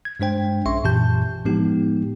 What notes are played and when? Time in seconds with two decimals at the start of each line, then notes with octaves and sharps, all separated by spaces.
0.05 G#6
0.20 G2 G#3 D4 C5 G5
0.66 A#1 C#4 E5 C6 C#6
0.84 F#2 A#2 E3 G4 A5 G6
1.45 A2 F3 G#3 B3 D#4 G4